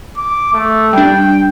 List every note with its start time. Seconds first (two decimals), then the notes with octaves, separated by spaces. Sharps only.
0.17 D6
0.53 A3
0.93 G3 D4 G5